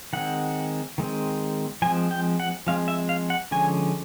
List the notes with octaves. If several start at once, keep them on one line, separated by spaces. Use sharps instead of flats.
D#3 G#3 C4 F#5
D#3 G#3 C4
F3 G#3 C4 G#5
G5
F#5
F3 G#3 C4 F5
E5
F5
F#5
D3 F3 G#3 C#4 G#5